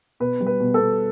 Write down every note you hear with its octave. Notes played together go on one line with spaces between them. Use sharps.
B2 B4
G3
B4
B2
A4
B2